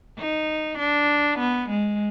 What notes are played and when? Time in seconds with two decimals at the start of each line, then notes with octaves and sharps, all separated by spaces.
0.19 D#4
0.78 D4
1.39 B3
1.69 G#3